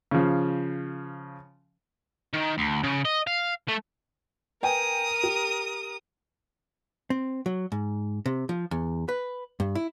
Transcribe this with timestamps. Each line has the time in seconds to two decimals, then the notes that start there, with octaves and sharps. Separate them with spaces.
0.11 C#3 F3
2.34 D#3
2.58 D2
2.84 C#3
3.05 D#5
3.27 F5
3.69 A3
4.63 A#4 B4 G5 G#5 D#6
5.23 G4
7.10 C4
7.46 F#3
7.72 G#2
8.26 C3
8.49 F3
8.71 E2
9.09 B4
9.60 G2
9.75 E4